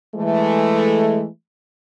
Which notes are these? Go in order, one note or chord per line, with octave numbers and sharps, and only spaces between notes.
E3 G#3 A3